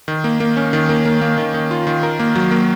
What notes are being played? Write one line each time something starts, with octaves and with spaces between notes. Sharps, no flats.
D#3
A#3
A#3
C#4
D#3
A#3
A#3
A#3
D#3
D#3
F4
D#3
A#4
A#3
F#3
A#3